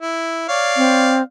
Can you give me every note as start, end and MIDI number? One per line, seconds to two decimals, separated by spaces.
0.01 0.45 64
0.49 1.20 73
0.49 1.20 74
0.49 1.20 77
0.77 1.22 60